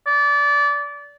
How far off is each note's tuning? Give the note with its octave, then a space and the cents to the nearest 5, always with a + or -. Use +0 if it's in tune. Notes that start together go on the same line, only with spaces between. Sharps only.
D5 -25